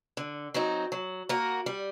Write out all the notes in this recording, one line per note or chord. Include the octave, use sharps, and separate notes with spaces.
D3
F#3 C4 D#4
F#3
A#3 F#4 A#4
G3